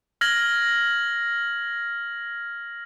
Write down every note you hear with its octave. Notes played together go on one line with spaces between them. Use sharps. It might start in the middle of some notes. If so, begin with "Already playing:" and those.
F6 G#6 A#6 F#7